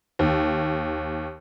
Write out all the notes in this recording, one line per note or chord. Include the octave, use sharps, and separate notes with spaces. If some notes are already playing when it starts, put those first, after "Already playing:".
D#2